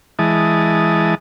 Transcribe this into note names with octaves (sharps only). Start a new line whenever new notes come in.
E3 G#3 A5 D#6